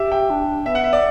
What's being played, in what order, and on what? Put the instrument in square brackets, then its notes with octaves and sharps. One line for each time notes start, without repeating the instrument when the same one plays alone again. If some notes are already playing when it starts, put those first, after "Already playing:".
Already playing: [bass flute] G4 [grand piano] E5
[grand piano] G5
[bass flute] D4
[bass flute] B3 [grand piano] E5
[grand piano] F#5
E5
D5